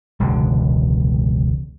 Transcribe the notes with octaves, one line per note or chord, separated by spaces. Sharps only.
E1 C#2 D3